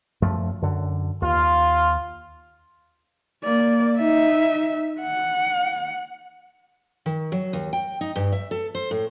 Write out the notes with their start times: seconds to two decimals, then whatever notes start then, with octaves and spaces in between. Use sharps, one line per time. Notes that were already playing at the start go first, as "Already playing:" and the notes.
0.22 F#2 F3 A3
0.62 F#2 D3
1.22 D#2 F4
3.43 A#3 D5
3.98 D#4 E5
5.00 F#5
7.06 D#3
7.32 F#3
7.53 D#2
7.73 G5
8.01 D#4
8.16 G2
8.32 E5
8.51 A4
8.75 C5
8.91 A2